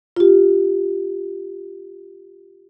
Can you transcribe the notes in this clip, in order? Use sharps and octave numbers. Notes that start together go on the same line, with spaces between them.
F4 G4